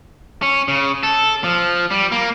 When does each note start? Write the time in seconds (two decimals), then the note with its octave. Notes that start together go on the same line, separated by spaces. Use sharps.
0.43 C#4
0.68 C#3
1.03 A4
1.44 F3
1.91 G3
2.12 A#3